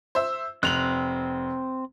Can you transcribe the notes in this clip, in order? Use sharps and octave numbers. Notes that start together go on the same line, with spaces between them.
C5 E5 E6
F1 C4 F#6 F7 F#7